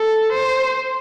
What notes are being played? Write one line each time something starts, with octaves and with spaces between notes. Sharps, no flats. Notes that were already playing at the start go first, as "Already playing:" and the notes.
Already playing: A4
C5